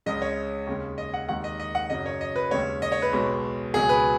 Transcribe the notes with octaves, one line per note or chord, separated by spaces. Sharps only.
C#2 C#3 G#3 D#5
C#5
D#2 C#3 G#3
D#5
F#5
D#2 D#3 G#3 F#5
D#5
D#5
F#5
F#2 C#3 F#3 D#5
C#5
D#5
B4
D#2 C#3 G#3 C#5
D#5
C#5
B4
B1 B2 G#3
C#2 B2 F#3 G#4
B4